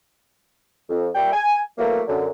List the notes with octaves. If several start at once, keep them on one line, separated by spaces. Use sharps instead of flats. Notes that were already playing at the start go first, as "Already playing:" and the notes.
F2
A#2 G3 E5 G5
G#5
E3 F#3 A3 A#3
F#2 D3